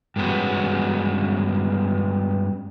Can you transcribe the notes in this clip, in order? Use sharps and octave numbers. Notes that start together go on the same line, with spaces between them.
G2 G#3 B3 C#4 F#4